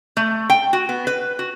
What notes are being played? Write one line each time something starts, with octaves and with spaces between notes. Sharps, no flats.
A3
G5
F#4
B3
B4
F#4